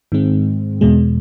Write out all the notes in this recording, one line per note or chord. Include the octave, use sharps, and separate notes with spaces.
G#2 D#3 G#3 C4
E2 B2 G#3